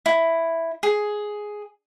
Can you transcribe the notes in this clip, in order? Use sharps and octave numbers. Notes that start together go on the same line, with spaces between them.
E4
G#4